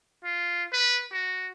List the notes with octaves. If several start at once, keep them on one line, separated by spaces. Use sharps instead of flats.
F4
B4
F#4